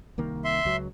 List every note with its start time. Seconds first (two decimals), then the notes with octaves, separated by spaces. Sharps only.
0.18 C2 D#3 A#3
0.44 E5 C6
0.65 C#2 F#3